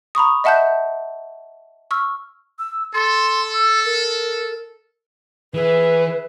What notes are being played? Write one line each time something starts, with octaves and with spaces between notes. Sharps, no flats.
A#5 B5 C#6 D#6
D#5 E5 F#5 A5 F#6 G6
C#6 E6 F6
E6
A4 C6
E6
A#4
E3 G#4 B4 E5